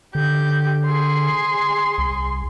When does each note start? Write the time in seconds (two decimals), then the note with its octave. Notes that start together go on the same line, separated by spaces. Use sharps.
0.15 D3 G4 G6
0.86 G#4 C6
1.98 C2